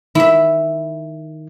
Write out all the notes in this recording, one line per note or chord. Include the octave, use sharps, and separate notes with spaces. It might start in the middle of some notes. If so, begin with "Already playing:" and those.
D#3 E4 E5